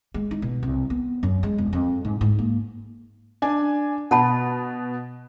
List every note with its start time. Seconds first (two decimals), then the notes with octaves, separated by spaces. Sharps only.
0.14 G#3
0.31 D#4
0.42 B2
0.63 C2
0.90 B3
1.23 F#2
1.43 G#3
1.58 E1
1.73 F2
2.05 G#2
2.21 G#2
2.39 A#3
3.42 D4 G#5
4.11 B2 F#5 A5 B5